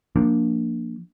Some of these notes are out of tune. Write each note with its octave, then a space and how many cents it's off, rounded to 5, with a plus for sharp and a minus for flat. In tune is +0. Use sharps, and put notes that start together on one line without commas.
F3 +0 A#3 +0 D4 +0